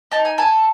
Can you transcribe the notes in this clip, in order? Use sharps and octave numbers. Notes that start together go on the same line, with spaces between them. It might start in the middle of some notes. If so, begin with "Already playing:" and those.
D#4 A5
G#5
A4 G#5